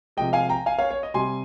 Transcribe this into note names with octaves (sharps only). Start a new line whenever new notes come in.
C3 F3 G#3 D#5 G5
F5 G#5
G5 A#5
F5 G#5
C#5 F5
C#5
D#5
C3 G3 G#5 C6